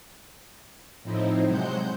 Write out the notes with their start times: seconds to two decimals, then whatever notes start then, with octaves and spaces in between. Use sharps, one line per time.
1.03 A2 F3 C4 D#4 E4
1.47 C3 F#3 G#3 C5 F#5 G6